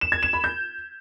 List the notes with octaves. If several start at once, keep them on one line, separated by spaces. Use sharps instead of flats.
E7
G#6
E7
B5
G6